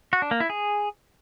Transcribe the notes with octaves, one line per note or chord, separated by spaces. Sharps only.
F#4
D4
A#3
E4
G#4